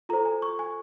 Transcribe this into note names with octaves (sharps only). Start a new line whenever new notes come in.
F4 A4 C5 A#5
G#5
C#6
G#5